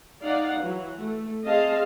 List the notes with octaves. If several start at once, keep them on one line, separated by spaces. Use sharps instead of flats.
D#4 D5 F5 F#5
E3 F#3 F#4
A3
C4 G#4 D#5 F5 A5